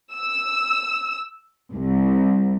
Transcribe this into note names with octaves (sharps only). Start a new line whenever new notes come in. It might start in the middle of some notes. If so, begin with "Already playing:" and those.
E6
C2